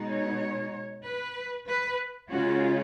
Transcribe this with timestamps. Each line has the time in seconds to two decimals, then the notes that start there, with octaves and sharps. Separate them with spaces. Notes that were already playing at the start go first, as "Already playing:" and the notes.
Already playing: B2 G#3 D#4
0.10 C#5
1.05 B4
1.69 B4
2.31 C#3 G#3 C#4 F4 F#4